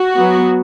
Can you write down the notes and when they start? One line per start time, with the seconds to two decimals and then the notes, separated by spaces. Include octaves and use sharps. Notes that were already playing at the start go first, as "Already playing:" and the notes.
Already playing: F#4
0.15 F#3 B3